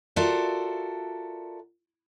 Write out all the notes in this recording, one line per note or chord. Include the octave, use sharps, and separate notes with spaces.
F4 F#4 A4 A#4 D5 E5